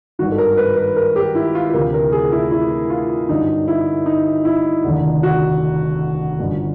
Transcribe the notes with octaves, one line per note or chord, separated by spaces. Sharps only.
G#1 G2 D#3 F#4
A4
A#4
B4
B4
A#4
G4
E4
F4
D2 C3 E3 A#4
A#4
G#4
E4
E4
F4
G1 F#2 D3 D#4
E4
D#4
E4
F1 D#2 D3
F#4
G1 F#2 D3